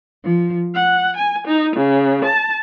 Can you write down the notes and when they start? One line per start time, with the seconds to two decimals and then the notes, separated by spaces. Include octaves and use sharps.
0.24 F3
0.74 F#5
1.16 G#5
1.47 D#4
1.76 C#3
2.24 A5